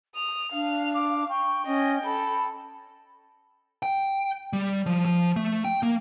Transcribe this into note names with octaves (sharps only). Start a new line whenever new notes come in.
D#6 F7
D4 F5
D6
G5 C#6
C#4 D#5
A4 B5
G5
G3
F3
F3
A3
G5
A#3